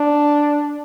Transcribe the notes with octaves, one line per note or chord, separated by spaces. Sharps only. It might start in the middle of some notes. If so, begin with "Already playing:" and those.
Already playing: D4